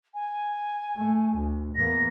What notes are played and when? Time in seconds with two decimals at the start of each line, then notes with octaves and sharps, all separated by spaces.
0.14 G#5
0.98 A3
1.36 D2
1.75 E2 A#3 A#6